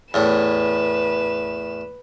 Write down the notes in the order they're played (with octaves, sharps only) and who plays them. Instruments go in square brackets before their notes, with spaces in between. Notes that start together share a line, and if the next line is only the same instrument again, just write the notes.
[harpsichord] E2 A2 [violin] B4 E7